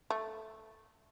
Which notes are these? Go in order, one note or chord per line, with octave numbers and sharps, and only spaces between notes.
A3